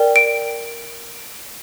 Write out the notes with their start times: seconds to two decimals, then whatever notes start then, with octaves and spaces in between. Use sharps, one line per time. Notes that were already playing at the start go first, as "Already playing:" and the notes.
Already playing: A#4 D5 G5
0.16 D7